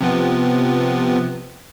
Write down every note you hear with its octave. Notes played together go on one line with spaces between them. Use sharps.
C3 F3 B3